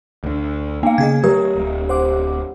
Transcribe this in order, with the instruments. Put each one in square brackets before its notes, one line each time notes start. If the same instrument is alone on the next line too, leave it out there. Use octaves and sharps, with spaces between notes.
[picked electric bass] D2 D3
[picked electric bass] A#3 [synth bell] B3 F5
[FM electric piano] C#3 G#4 D#5 [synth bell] G#6
[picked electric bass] F#3 A3 [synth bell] G4 [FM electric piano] A#4
[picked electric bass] D1
[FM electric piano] C5 F#5 D6